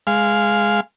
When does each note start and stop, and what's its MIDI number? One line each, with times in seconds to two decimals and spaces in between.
0.07 0.80 56
0.07 0.80 77